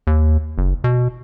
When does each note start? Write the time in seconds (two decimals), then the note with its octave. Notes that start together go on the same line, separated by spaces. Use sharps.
0.07 D#2
0.58 F#1
0.84 B2